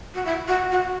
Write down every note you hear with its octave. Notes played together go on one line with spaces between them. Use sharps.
F#4
E4
F#4
F#4